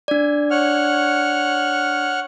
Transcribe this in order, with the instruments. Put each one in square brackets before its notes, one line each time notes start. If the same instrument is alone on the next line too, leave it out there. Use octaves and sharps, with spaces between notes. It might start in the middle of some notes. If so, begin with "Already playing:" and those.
[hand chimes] D4 D5
[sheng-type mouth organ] C#5 F#5 F6